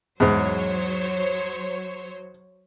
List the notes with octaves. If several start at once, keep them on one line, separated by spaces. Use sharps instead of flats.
E2 G#2 F#3 C5 C#5